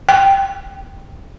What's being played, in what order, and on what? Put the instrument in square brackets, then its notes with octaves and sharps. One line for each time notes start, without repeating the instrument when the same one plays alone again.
[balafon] G5